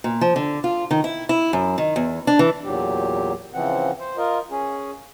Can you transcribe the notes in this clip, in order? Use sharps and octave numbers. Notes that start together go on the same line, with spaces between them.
A#2
F3
D3
F4
D#3
E4
E4
F#2
D#3
E2
D4
E3
E2 A#2 F#3 G4
C#3 E3 F3 C4 F#5
C5
F4 A#4 D#5
C#4 G#4